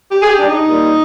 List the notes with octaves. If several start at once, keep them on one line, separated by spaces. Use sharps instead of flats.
G4
G#4
G4
D4
D#4
A#2 G3